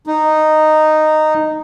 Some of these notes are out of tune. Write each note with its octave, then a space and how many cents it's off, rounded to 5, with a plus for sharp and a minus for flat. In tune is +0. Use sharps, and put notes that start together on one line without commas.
D#4 -10